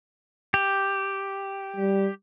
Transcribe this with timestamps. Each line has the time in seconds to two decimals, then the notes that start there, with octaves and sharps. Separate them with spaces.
0.54 G4
1.76 G3